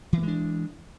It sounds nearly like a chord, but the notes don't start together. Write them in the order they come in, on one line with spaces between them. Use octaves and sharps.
E3 A#3 G#3 D4